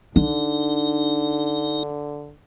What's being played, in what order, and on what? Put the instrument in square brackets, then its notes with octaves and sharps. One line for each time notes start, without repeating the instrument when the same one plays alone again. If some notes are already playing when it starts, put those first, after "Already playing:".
[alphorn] D3 [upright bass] D4 [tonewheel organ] D#4